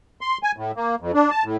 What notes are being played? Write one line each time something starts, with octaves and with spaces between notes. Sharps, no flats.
C6
G#5
A2
A#3
F2
D4
A5
A2